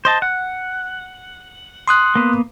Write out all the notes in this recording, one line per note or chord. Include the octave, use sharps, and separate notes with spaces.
C5 D#5 A5
F#5
C6 D#6 F#6
A#3 B3